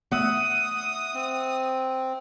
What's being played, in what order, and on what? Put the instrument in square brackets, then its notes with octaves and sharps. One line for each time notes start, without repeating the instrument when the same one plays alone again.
[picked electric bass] A3 B3 [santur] E5 F#5 [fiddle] D#6
[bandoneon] C4